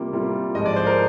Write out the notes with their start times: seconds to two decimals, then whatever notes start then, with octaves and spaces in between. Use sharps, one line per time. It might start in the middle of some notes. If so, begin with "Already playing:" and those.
Already playing: C3 G3 A#3 F4
0.13 C3 G3 A#3 F4
0.55 G#2 F3 G#3 D#5
0.66 D5
0.76 C5
0.87 A#4